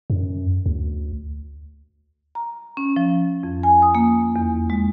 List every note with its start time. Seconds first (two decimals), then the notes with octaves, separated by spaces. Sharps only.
0.10 F#2
0.66 D2
2.35 A#5
2.77 C#4
2.96 F3
3.43 F2
3.63 G#5
3.82 D#6
3.95 A#3
4.36 E2
4.70 G#3